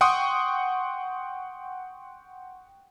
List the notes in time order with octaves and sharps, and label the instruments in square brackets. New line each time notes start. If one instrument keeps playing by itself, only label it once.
[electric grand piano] F#5 G5 C6 C#6 D#6